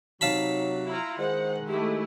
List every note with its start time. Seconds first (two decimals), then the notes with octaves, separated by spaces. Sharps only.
0.21 C3 F#3 D#4 F5 A5 B5
0.88 E4 F4 A#5
1.19 D#3 G#3 C5 F#5
1.68 A3 E4 G4